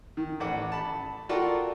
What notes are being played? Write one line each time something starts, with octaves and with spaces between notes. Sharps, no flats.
D#3
A1 F#5 D6
A5 B5
F4 F#4 A4 A#4 D5 G5